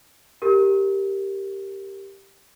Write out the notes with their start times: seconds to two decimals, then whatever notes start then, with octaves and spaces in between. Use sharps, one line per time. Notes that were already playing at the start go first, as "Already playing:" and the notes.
0.42 G4 A#4